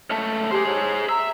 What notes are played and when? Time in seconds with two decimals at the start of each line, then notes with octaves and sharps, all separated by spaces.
0.10 C#2 A3
0.51 G4 G#4 C5
0.67 C#5
1.09 E5 A#5